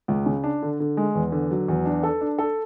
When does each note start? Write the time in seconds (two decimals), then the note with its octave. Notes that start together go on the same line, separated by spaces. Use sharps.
0.08 C#2
0.26 C#3
0.44 D4
0.62 D3
0.80 D3
0.97 G#3
1.15 E2
1.32 D3
1.51 F#3
1.68 E2
1.85 D4
2.03 A4
2.21 D4
2.39 A4